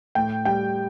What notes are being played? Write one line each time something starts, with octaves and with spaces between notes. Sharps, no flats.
A2 G5
G3 G5